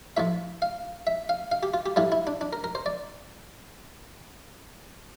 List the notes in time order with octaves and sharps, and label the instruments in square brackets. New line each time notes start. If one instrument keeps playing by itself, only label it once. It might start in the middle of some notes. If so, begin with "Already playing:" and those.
[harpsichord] A2 F3 E5
F5
E5
F5
F5
G4
F4
G4
A2 E3 G3 F4
E4
D4
D4
A#4
A#4
C5
D5